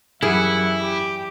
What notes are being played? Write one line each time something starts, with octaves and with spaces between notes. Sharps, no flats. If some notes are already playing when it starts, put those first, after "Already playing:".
F#2 E3 G3 E4 G#4 E5 F#5
G4